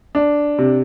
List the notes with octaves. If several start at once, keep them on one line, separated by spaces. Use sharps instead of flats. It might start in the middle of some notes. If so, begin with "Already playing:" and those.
D4
C3